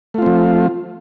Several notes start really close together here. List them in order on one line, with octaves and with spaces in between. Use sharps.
A3 F4 C4 F3